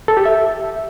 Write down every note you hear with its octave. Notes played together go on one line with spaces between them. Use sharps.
A4
G4
E5